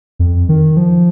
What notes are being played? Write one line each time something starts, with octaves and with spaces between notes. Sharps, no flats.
F2
D#3
F3